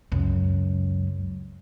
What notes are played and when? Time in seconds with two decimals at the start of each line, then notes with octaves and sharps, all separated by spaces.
0.12 C#2 F#2